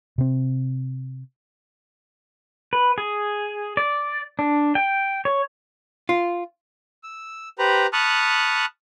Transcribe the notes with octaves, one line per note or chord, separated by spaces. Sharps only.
C3 C4
B4
G#4
D5
D4
G5
C#5
F4
E6
G4 B4 C5 A#5 B5
A5 B5 C#6 D#6 F6 F#6